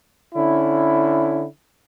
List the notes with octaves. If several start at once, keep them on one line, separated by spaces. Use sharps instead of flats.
D3 C#4 E4